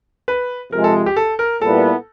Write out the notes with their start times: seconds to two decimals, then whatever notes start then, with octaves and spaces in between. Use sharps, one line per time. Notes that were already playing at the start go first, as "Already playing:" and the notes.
0.28 B4
0.72 C3 F3 G#3 A#4
0.84 A4
1.06 G4
1.16 A4
1.39 A#4
1.62 A#2 G3 B3 E4 A4